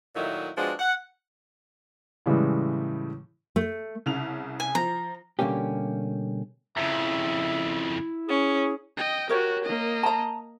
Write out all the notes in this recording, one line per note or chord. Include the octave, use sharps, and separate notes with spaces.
A#2 D#3 F#3 A3 D#4 E4
F3 G#3 B3 C4 D4 F#4
F#5
A2 C#3 E3 G3 G#3
A3
C2 C#3 F7
G#5
F3 A#5
B2 D3 G3 A#3 C#4 G4
F2 C#3 E4 E5 A#5
C#4 G#4
D#5 G5
F#4 G4 A#4 C#5
A#3 D#5
A5 A#5